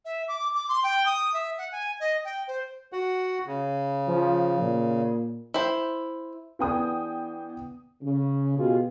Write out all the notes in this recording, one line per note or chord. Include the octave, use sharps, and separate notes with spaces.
E5
D6
D6
C6
G5
D#6
E5
F#5
G#5
D#5
G5
C5
F#4 F#5
C#3
F3
A#2
E4 C5
E3 B3 D4 G#4 G5 D#6
C#3
B2 F4 G4 G#4